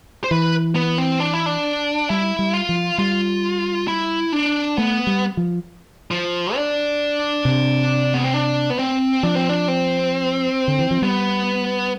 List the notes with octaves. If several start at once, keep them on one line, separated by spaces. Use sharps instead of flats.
C5
E3 B4
B3
C4
D4
E4
D4
G3 E4
G3
F4
F3
G3 F4
E4
D4
A3 B3
G3
F3
F3
D4
C3
B3
C4
D4
B3
C4
F3 D4
C4
D4
C4
D3
E3
F3
G3 B3